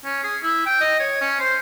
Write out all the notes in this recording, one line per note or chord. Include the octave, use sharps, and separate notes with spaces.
C#4
G#4
E4
G5
D#5
C#5
C#4
C5